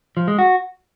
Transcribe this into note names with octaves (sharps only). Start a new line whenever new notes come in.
F3
G#3
F#4